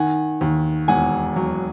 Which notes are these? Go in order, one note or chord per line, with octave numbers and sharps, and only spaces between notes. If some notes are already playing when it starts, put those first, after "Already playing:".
Already playing: D#3 F#5 G#5
D#2
E1 F#5 G#5
F#3